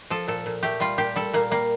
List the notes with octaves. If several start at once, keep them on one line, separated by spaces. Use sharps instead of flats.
F3 A4
A#2 A4
A#2
A3 G4
G3 F4
A#2 G4
G3 A4
A#2 A#3
G3 A#3